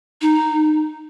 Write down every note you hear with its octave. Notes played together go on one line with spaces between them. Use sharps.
D#4